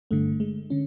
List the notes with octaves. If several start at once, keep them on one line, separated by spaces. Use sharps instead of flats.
G1 G2 D3 A3
G#3
D3 C#4